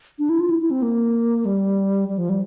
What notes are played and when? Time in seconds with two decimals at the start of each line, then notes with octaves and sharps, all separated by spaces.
0.19 D4
0.29 E4
0.40 F4
0.50 E4
0.61 E4
0.71 C4
0.82 A#3
1.45 G3
2.09 G3
2.18 F3
2.29 G3